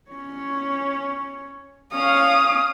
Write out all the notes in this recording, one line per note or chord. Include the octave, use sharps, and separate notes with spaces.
C#4 C#5
C#4 C#5 F5 D#6